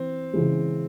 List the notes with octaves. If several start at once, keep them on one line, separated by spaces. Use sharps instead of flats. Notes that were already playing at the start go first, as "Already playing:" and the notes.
Already playing: E3 C4
C#3 E3 G#3